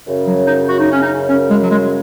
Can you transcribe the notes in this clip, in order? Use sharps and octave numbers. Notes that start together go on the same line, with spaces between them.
F#2 C#3
F#3
D#4
F#4
D#4
C#4
D#4
C#4
G#3
F#3
G#3